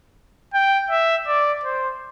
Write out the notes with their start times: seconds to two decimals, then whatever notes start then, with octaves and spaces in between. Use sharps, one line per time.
0.54 G5
0.90 E5
1.27 D5
1.64 C5